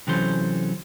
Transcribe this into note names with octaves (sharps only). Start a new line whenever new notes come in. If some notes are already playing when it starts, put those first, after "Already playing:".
C3 E3 F#3 C#4 A4 C5